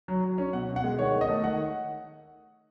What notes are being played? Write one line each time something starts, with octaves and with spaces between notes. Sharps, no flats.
F#3
F#3
C#4
B2 F#5
B2
F#5
G#3
D#3 C#5
D#3
D#5
A3
D#3 F#5